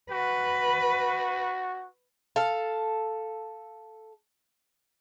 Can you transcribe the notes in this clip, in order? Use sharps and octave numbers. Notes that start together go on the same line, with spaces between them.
F#4 B4
A4 F5